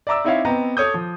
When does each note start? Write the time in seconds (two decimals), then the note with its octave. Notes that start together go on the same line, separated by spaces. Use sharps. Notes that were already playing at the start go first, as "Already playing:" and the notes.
0.07 D5 E5 A#5 D6 E6
0.25 C4 D#4 E4 C#5 E5 F5
0.45 B3 C4 D#5 G5 A#5
0.77 A4 C#5 D#6 G6
0.94 F3